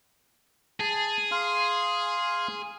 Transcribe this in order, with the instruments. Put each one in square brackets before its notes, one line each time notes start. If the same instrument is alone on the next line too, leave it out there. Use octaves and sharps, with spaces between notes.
[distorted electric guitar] G#4 [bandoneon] A5
[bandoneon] F5 C6 F6